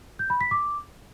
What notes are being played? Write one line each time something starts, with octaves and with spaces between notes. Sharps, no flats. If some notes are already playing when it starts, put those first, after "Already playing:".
G6
B5
B6
D6